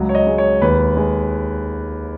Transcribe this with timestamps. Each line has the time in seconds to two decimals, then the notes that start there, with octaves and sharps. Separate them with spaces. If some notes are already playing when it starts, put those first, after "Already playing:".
Already playing: C#2 F#3
0.09 C#5
0.15 D#5
0.27 G#3
0.38 C#5
0.62 D#2 B4
0.97 G#3